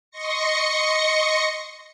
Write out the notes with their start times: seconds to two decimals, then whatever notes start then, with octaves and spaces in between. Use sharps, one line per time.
0.11 D#5 C6 C#6 A#6 C#7